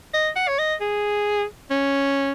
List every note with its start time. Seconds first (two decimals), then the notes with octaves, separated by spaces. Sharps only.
0.14 D#5
0.36 F#5
0.48 C#5
0.59 D#5
0.81 G#4
1.71 C#4